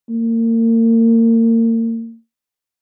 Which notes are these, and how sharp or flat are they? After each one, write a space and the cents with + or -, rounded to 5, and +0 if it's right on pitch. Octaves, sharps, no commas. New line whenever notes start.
A#3 -35